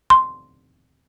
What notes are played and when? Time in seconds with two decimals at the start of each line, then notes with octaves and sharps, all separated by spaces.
0.10 C6